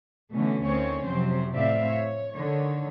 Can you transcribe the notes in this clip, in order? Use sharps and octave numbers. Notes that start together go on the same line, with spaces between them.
B2 D3 E3 A3 C#4
D2 D3 D#3 C4 C#4 C#5
F2 C3 F#3 C4 C5
A2 C4 D5 E5 F5
C#5
D3 D#3 C#5